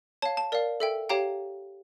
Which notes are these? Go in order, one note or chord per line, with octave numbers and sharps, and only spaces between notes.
C#5 F5 A5
A5
A#4 D5 F5
A4 E5 G5
G4 C#5 F5 G5 A#5